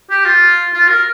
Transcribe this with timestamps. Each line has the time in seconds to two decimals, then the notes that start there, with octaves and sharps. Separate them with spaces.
0.10 G4
0.25 F4
0.73 F4
0.89 A#4